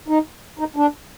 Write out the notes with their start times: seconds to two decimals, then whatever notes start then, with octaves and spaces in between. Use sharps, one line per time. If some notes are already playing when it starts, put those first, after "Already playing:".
0.08 D#4
0.59 D#4
0.76 D4